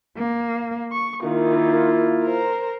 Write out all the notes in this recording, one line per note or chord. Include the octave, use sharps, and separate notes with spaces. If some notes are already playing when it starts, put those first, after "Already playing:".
A#3
C#6
D#3 A#3 E4 F4
A#4 C5 A#5